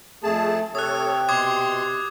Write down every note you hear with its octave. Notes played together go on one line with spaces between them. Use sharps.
F2 A3 G#4 A5
C3 G4 A4 C#5 D#6 F#6
B2 C6 D6 D#6 G#6